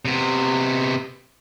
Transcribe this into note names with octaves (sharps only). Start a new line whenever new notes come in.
C3 B3